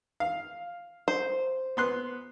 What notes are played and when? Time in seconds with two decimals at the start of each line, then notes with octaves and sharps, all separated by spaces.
0.20 F5
1.08 C5
1.77 B3 C6 F#6